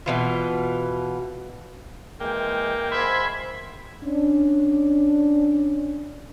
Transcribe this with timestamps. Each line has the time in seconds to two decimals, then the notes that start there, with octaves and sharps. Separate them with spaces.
0.06 B2 E3 F4
2.20 E3 G#3 A#3 G5
2.92 G#2 E5 B5 C6 G#6
4.04 C#4 D4